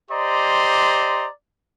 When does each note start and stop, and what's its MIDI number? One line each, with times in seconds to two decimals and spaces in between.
0.11 1.28 67
0.11 1.28 72
0.11 1.28 74
0.11 1.28 75
0.11 1.28 82
0.11 1.28 84